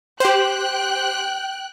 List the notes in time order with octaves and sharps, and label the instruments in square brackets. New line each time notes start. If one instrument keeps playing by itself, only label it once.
[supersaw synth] G4 C5 [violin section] G5 F#6